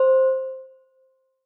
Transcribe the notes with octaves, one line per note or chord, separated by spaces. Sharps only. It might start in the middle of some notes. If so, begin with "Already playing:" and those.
Already playing: C5